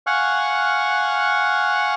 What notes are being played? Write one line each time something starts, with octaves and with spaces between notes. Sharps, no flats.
F5 F#5 G#5 C#6 F6 F#6